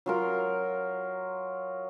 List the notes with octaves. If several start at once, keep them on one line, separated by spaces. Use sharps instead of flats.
F#3 F4 A#4